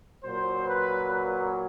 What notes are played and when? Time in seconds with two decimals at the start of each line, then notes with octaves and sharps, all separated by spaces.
0.24 A#2 F#3 C5
0.67 B4
1.09 B4